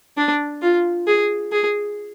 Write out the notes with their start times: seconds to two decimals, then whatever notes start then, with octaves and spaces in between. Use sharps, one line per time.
0.17 D4
0.62 F4
1.07 G#4
1.52 G#4